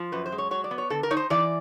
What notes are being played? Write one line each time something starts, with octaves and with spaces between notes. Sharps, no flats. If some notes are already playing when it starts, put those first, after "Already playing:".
Already playing: F3
F#2 B4
C5
G#3
C#5
F#3 C#5
D5
B3
C#5
D3 A4
A#4
D#4 C#5
C5
E3 D5